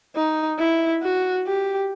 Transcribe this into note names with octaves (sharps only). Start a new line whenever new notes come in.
D#4
E4
F#4
G4